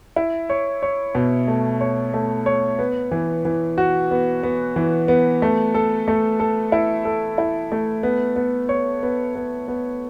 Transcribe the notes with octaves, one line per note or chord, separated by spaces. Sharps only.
E4
C#5
C#5
B2
A3
C#5
A3
C#5
B3
E3
E3
F#4
B3
B3
E3
B3
A3
A4
A3
A4
E4
A4
E4
A3
B3
B3
C#5
B3
B3
B3